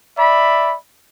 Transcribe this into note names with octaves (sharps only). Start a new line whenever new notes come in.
D5 E5 B5